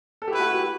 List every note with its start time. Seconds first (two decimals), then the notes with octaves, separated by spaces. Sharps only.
0.22 A4
0.28 A3 E4 G4 B4
0.40 F#4
0.53 G4